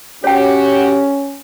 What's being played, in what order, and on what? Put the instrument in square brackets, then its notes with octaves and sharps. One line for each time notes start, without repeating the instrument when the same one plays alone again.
[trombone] C#4 [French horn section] F#4 G4 [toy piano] C#5 G5